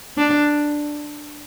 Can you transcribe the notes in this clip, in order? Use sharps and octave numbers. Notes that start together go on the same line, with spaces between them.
D4